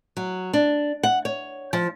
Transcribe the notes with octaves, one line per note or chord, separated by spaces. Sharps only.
F#3
D4
F#5
C#5
F3